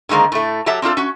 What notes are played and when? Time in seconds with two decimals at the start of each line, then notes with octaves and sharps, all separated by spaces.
0.09 D3 D#3 G#3 A#3 C4
0.32 A2 A3
0.66 F#3 G4 A4 E5 A5
0.82 C4 D4 F4 A4
0.97 C#4 F#4